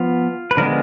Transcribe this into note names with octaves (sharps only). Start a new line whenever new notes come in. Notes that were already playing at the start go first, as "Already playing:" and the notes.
Already playing: F3 B3 F4
B4
D3 F3 G#3 B3 A#4